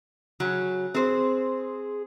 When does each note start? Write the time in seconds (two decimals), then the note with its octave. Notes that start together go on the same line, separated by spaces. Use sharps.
0.40 C#3 F#3 C#4
0.94 C4 G#4 C5